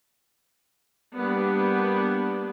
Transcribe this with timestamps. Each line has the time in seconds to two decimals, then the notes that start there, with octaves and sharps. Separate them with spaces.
1.15 G3 A#3 B3 D4